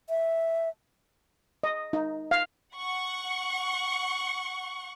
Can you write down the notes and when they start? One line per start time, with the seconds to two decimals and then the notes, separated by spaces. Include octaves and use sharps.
0.09 E5
1.63 D#5
1.93 D#4
2.31 F5
2.77 F#5 C#6